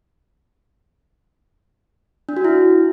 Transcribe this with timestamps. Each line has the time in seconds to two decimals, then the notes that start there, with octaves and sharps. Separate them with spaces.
2.29 D4
2.37 F#4
2.45 E4